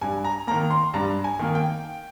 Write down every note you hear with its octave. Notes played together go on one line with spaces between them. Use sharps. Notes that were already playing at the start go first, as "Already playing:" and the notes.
G2 G#5
A#5
D#3 A#3 A#5
C6
G2 A#5
G#5
D#3 A#3
G5